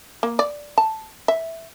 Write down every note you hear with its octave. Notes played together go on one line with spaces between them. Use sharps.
A#3
D5
A5
E5